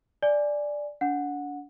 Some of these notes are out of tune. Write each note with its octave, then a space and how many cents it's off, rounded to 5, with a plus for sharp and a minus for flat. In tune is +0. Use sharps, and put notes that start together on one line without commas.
D5 +0 G#5 +0
D4 -35 F#5 -15